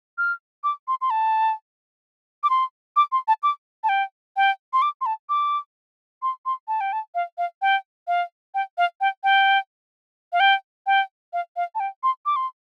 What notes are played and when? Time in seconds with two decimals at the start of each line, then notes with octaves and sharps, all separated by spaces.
0.18 F6
0.64 D6
0.88 C6
1.01 C6
1.10 A5
2.43 D6
2.50 C6
2.96 D6
3.12 C6
3.28 A5
3.43 D6
3.84 A5
3.89 G5
4.37 G5
4.73 C6
4.82 D6
5.01 C6
5.06 A5
5.29 D6
6.22 C6
6.46 C6
6.68 A5
6.81 G5
6.93 A5
7.15 F5
7.38 F5
7.62 G5
8.08 F5
8.54 G5
8.78 F5
9.01 G5
9.24 G5
10.33 F5
10.40 G5
10.87 G5
11.33 F5
11.57 F5
11.75 A5
11.80 G5
12.03 C6
12.26 D6
12.36 C6